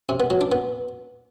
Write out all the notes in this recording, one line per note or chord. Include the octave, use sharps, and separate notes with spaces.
C3
B3
F#3
D4
B3